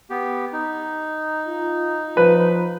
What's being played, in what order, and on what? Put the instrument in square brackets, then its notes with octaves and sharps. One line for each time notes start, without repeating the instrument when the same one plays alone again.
[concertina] B3 G4
D#4
[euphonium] F4
[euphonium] F3 [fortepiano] B4